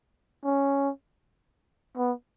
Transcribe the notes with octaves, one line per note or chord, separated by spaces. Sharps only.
C#4
B3